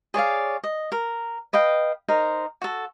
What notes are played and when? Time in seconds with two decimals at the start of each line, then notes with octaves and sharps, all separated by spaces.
0.14 G#4 C#5 D5 F5
0.64 D#5
0.92 A#4
1.53 B4 D#5 F5 G5
2.08 D#4 A#4 C5
2.62 F#4 A4